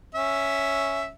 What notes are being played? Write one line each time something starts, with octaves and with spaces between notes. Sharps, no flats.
C#4 E5